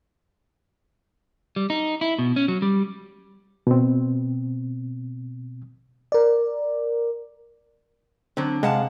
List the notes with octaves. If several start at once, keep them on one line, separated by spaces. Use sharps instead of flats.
G3
D#4
E4
B2
C#4
F#3
G3
B2 C4
A#4 D5
D3 F#3 C4
C3 G#3 G#4 F5 F#5 A5